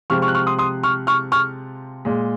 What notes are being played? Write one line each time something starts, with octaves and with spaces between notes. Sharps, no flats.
C3 F3 G#3 C#6 F6
C#6 F6
F#6
C#6 F6
C6 D#6
C6 D#6
C#6 F6
C#6 F6
C#6 F6
A#2 G#3